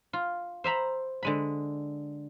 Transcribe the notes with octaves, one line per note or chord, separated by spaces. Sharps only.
F4
C5 E5 A#5 B5
D3 G#3 B5